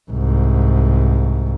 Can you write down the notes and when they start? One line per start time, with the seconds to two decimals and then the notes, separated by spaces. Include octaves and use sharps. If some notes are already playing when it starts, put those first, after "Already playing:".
0.11 C2 G#2